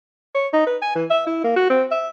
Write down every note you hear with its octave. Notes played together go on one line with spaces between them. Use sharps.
C#5
D#4
B4
G#5
E3
E5
E4
A#3
F#4
C4
E5